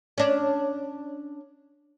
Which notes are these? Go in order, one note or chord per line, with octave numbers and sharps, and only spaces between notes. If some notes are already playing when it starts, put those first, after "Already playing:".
C#4 D4